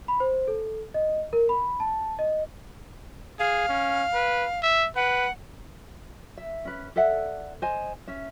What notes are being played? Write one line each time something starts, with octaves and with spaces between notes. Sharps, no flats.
B5
C5
A4
D#5
A#4
B5
A5
D#5
G#4 F5
C#4
B4
E5
B4 F#5
E5
C#4 B4
A4 D5 E5 F#5
C5 D#5 G#5
C#4 E5